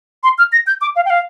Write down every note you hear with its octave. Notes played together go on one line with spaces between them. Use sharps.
C6
F6
A#6
G6
D6
F5
G5
F5